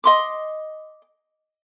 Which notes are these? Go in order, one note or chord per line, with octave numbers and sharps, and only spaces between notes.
D#5 C6 D6